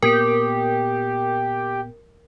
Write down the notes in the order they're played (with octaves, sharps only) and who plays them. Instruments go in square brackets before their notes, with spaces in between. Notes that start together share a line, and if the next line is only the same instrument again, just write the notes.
[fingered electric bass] A#2 A#3 B3 [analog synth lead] G4 [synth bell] A#4